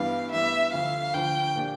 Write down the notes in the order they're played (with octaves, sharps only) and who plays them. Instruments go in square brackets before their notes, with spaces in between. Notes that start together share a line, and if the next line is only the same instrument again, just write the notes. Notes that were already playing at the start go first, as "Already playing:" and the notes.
Already playing: [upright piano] G2 E3 G3 B3 [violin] F5
[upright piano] G2 E3 G3 B3 [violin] E5
[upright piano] D2 D3 F3 [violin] F5
[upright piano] D2 D3 F3 [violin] G5
[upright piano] A#2 F3 A#3 D4 G4